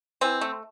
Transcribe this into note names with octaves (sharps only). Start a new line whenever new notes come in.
E3 C4
A3